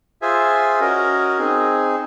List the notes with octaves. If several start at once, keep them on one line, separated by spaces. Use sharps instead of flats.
F4 G#4 C5 E5 G#5
C#4 F#4 A#4 D#5
C4 D#4 G#4